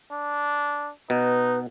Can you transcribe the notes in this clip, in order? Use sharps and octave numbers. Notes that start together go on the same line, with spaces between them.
D4
B2 D#4 B4